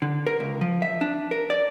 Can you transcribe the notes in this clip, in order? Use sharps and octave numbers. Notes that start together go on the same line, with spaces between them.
D3
A#4
C#2
F3
E5
D4
A#4
D5